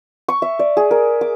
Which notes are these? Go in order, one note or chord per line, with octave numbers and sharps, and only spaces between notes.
C#6
E5
D5
G#4
A#4
D6